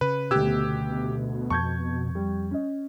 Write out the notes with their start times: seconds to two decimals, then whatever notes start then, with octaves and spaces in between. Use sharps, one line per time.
0.01 C#3 B4
0.31 D2 B2 G4 E6 F#6 G#6
1.50 F2 A5 C#6 G6 G#6
2.15 G3
2.51 C#4 D#5